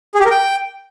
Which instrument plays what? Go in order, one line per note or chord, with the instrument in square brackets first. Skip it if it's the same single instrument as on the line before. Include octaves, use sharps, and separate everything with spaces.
[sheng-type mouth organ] G#4
G4
A#4
G5